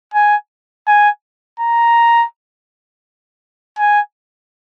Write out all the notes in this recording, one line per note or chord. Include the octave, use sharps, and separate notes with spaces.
G#5
G#5
A#5
G#5